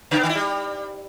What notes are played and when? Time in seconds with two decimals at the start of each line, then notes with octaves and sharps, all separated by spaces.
0.11 C#3
0.17 B3
0.23 D#3
0.29 E4
0.35 G3